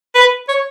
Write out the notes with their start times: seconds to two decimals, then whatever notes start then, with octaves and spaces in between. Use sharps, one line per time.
0.15 B4
0.48 C#5